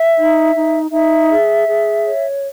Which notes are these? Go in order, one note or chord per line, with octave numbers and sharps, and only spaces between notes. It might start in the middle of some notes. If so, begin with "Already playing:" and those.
Already playing: E5
D#4
D#4
D#4 E5
G#4
G#4
C#5